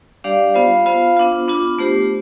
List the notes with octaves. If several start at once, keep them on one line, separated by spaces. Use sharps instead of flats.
G3 D4 G4 D5 F5
B3 F4 C5 F5
B3 F4 C5 F5
B3 D4 F4
B3 D4 F4
A3 D4 G4 C5